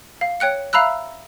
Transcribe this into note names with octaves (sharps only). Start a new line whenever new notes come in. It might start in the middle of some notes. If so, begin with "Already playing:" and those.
F5
C#5 G5 F#6 C#7
E5 F5 A#5 B5 E6 F#6